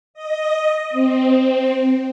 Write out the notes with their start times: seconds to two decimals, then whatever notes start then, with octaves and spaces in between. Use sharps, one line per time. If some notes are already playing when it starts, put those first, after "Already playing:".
0.14 D#5
0.90 C4